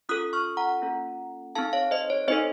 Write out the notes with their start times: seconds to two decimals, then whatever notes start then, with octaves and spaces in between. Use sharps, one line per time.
0.09 C#4 F4 A4 D#6 F#6
0.33 C#6 F6
0.57 F#5 A#5
0.82 A#3 C#4 F4 A4
1.55 C4 D#4 A4 F5 A5
1.73 C#5 F5
1.91 C5 D#5
2.10 C#5
2.28 C4 D#4 A4 C5 D#5